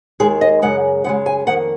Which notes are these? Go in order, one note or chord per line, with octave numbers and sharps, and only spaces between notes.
D#2 D#3 G#3 G#4
D#5
F#2 C#3 G#3 F#5
F#2 C#3 G#3 F#5
G#5
F2 D#3 A#3 F#5